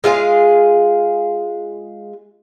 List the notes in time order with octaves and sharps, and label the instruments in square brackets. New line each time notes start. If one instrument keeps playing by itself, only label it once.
[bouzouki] G#3 F4 G#4 F5